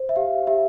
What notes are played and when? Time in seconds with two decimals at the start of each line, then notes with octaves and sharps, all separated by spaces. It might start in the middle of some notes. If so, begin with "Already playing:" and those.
Already playing: C5
0.09 E5
0.16 G4 F5
0.47 G4 E5